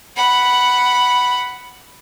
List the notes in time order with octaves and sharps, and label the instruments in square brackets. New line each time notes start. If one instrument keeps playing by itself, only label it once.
[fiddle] F#5 B5